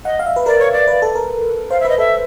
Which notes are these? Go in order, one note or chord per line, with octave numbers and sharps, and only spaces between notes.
D#5 F#5
F5
E5
B4
A#4 D5
C#5
D5
B4
A4
A#4
C5 F5
E5
B4 D#5
A4 E5